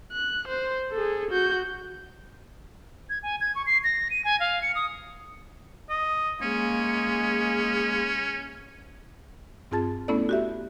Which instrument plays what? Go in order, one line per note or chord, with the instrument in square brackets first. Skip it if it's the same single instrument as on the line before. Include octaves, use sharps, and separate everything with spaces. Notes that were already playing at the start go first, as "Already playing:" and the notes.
[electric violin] F#6
C5
G#4 A4
F#4 G6
[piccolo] G#6
G#5
G#6
C#6
C7
A#6
D#7
G#5
F5
C#7
D#6
[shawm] D#5
[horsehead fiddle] G#3 A#3 [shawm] C#4
[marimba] G2 C4 F4 G#4 A5 A6
A3 B3 C#4 E4 A4 D5
F#4 G4 E5